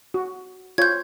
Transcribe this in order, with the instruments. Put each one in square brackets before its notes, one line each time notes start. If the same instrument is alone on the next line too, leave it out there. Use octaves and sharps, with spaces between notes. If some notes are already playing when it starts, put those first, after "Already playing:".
[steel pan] F#4
[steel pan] F4 C#5 [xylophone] G6 G#6